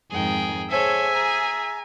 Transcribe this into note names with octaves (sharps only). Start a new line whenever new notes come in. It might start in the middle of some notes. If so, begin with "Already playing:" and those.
F2 G#2 D#3 G#4 G5
G#4 A4 C5 C#5 E5 G#5
G#4 A#5